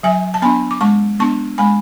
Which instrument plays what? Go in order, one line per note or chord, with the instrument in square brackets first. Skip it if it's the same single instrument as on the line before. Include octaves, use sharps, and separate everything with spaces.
[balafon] F#3 E5 G#5
A5
B3 D4 G#5 B5
D6
G#3 A5 C#6
B3 D4 A5 C#6
G#3 G#5 B5